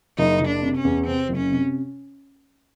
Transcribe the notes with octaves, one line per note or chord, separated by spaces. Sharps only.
F#1 D#4
F#1
D4
C3
C#4
E2
C3 C4
F#1
C#4
C3